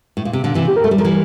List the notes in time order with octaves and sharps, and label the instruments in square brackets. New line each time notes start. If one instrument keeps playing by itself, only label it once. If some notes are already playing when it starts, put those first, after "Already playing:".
[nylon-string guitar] A2
A#2
C3
A#2 D3
C3 E3
[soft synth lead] G4
A#4
[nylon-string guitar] A3 [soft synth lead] A4
[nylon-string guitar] G3
[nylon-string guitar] F3 [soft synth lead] A#4
[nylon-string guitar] E3 G3